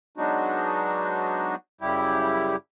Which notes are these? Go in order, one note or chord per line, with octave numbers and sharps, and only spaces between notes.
F#3 G#3 B3 D4 D#4 F#4
F#2 C#3 G3 E4 G4